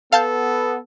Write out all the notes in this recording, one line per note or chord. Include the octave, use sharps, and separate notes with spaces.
B3 A4 F5 A5 G6